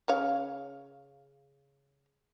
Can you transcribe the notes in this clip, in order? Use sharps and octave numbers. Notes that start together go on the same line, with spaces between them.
C#3 C#5 F5